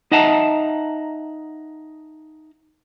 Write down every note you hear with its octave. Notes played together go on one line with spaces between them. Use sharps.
D#4 D#5 E5 F#5 A5 A#5